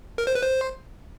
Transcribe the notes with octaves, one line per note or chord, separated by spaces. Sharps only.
A#4
C5
B4
C5